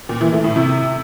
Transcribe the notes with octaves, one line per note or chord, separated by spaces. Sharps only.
A#2
E3
A3
A2
C3